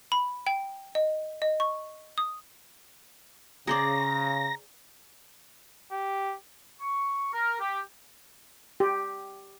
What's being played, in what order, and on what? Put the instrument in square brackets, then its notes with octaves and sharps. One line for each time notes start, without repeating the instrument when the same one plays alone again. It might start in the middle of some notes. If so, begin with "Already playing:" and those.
[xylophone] B5
G5
D#5
D#5
C#6
D#6
[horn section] C#3 [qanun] G#4 C5 D5 [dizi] A#5 [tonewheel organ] A#6
[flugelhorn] G4
[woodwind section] C#6
A#4
G4
[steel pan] G4